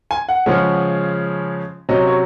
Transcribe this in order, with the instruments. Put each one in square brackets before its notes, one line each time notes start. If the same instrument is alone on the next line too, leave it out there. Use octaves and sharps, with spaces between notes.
[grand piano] G#5
F#5
C#3 F3 G#3 C#4
C3 F#3 C#4 D#5
C#5